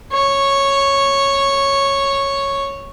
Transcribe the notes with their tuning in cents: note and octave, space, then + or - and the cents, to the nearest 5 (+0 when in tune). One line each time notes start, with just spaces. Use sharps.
C#5 -5